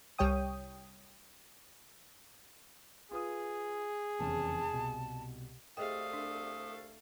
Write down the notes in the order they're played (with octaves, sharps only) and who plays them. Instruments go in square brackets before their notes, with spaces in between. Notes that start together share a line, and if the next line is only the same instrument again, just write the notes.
[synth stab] C2 G3 C#5 G5 D#6
[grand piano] F4 B4 D#6 [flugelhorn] G#4
[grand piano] F1 E2 C#3 [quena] A5
[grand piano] C2 B2
[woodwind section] C2 [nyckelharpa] A3 F5 [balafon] G#4 D#5 G5 [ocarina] D#6
[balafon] D4